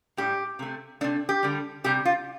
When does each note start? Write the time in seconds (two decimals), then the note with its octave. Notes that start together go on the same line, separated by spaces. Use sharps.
0.17 A2 G3 G4
0.59 C3 A3
1.01 A3 D4
1.04 C3
1.29 G4
1.43 D3 G3
1.84 C3 G3 G4
2.05 F4